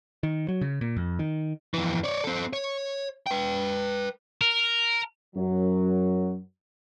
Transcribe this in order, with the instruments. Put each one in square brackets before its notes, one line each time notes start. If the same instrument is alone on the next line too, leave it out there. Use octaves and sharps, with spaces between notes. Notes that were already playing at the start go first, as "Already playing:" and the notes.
[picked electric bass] D#3
F#3
C#3
A#2
F2
D#3
[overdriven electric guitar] F2 E3
C#5 D5
C4 A4
C#5
B4 G5
[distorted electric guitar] A#4
[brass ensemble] F#2 F#3